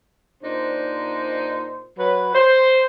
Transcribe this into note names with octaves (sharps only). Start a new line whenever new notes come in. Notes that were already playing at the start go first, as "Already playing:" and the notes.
A#2 D4 D#4 C5
F#3 B4
C5